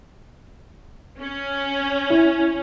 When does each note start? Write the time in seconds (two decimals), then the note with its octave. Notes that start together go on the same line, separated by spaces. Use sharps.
1.19 C#4
2.10 E4